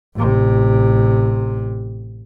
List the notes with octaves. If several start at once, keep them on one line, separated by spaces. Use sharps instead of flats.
A1 C3